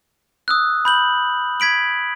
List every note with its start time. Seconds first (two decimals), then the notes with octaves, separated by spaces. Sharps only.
0.48 D#6 E6 F#6
0.85 B5 G6 F#7
1.60 G#6 B6 D7 F#7